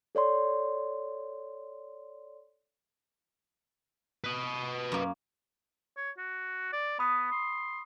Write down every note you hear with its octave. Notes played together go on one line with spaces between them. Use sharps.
A4 C#5 D5 C6
B4 D#5
F#2 A#3
C#5
F#4
D5
B3 B5 D#6
C6